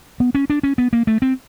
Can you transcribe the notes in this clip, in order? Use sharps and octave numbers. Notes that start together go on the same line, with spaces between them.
B3
C#4
D4
C#4
B3
A#3
A3
C4